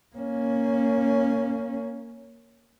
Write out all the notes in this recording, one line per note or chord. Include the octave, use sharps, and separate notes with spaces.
A#3 C#4